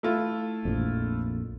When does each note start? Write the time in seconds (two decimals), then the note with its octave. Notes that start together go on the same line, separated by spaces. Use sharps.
0.03 A3 E4 F4
0.65 A#1 F2